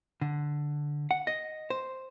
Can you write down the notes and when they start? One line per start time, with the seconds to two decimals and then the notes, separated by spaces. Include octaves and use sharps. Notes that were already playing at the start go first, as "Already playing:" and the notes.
0.21 D3
1.11 F#5
1.27 D#5
1.70 C5